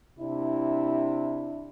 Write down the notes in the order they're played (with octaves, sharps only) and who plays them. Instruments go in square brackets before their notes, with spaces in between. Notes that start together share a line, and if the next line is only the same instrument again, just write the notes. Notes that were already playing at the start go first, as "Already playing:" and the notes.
[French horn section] C3 D4 E4